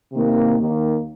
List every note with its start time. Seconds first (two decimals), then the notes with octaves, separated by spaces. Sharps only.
0.13 C3 D#3 A#3
0.56 D#2 D#3 A#3